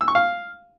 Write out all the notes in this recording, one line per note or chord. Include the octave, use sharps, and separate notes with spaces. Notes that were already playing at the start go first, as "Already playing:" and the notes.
E6
C#6
F5